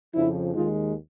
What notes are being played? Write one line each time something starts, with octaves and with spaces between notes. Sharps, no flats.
F2 C#3 F3 D4 E4
D#2 D#3 G#3 D#4 F4